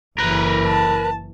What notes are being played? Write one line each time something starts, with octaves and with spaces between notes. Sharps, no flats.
F#1 E3 A#4 B4
A5